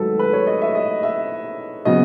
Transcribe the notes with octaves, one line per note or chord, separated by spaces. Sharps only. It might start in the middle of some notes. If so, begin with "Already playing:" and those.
Already playing: G#2 D#3 F#3 A3 A4 B4
B4
C#5
D#5
E5
D#5
E5
C#3 F#3 B3 D#5